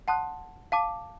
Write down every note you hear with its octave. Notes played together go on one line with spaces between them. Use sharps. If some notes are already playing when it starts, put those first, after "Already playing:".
F#5 A5 C6 D#6 F#6
F5 A5 D6